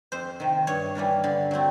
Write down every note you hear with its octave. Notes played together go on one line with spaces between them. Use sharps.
F2 C5
C3 D#3
G2 C#5
E3 G3 A#3 D4
D3
F#3 A3 C4